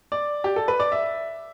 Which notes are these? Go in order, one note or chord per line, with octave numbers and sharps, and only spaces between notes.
D5
G4
A4
B4
D5
E5